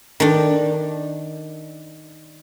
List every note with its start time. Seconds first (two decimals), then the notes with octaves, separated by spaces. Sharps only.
0.20 D#3 D4